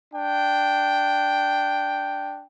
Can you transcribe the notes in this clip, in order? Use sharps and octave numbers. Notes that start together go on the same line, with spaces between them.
D4 G5